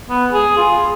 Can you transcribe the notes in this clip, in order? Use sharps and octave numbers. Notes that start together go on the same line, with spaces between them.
B3
G#4
F4